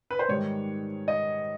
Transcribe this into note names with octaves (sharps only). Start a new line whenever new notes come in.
B4
C5
G#2 D#3 G3 C#5
D#5